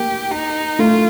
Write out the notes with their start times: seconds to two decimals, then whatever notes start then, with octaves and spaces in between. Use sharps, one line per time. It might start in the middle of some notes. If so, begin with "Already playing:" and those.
Already playing: A#3 G4
0.31 D#4
0.79 A3 F4